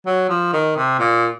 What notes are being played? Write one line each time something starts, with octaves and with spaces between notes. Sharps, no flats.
F#3
F3
D#3
C3
A#2